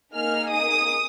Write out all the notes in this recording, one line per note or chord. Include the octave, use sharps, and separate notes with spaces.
A#3 D#4 G#4 F6
D#6